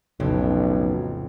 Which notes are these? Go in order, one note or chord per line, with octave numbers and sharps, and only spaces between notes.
B1 F2 A2 C#3